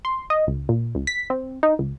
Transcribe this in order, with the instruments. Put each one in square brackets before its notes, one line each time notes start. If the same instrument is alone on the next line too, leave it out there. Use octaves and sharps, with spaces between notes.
[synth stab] C6
D#5
C#2
A#2
C#2
B6
C4
D#4
C#2